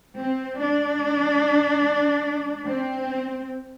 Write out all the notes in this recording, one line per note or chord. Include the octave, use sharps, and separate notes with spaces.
C4
D4
C4